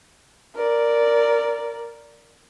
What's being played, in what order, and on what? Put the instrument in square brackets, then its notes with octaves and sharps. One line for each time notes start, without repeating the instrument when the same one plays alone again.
[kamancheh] A#4 D5